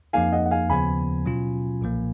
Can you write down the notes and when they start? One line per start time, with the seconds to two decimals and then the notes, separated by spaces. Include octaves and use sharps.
0.13 F2 F3 A#3 D#4 F5 G#5
0.32 D#5 F#5
0.45 F#5
0.51 F5 G#5
0.69 D#2 C#3 F3 B3 G#5 B5
1.26 B2 F#3 C#4 F4
1.81 B1 A#2 F3 A#3